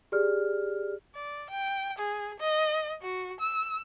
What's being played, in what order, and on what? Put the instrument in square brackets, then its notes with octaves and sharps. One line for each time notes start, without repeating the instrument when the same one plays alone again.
[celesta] G4 G#4 D5 F6
[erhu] D5
G5
G#4
D#5
F#4
E6